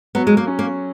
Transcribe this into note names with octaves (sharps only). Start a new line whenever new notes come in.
F#3 B3
G#3
A#3
C#4
A#3